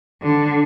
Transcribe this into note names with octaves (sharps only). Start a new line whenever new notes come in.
D3